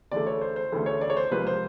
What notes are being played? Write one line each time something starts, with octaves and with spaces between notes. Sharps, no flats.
D2 C#3 E3 A3 D5
C#5
C5
C5
D2 C#3 E3 A3
C#5
D5
C#5
C5
C#2 C3 F3 A#3 B4
C5